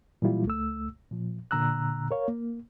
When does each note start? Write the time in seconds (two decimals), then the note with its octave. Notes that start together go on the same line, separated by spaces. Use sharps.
0.22 A#2 E3 F#3 G3 E4 F4
0.45 C#2 A3 E6
1.11 A#2 F3
1.51 A#2 D3 A#5 E6 F#6
2.11 A#4 C#5 F5
2.28 A#3